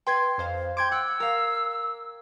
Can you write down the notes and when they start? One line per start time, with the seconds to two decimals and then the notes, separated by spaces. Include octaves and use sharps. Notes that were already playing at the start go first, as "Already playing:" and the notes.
0.07 B4 G5 C6 G#6
0.38 F2 C5 F5
0.77 G5 C6 D6 G#6 D7
0.92 F#5 E6
1.20 A#4 F5